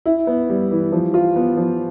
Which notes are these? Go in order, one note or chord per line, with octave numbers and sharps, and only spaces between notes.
E4
B3
G3
E3
F3
F4
B3
F3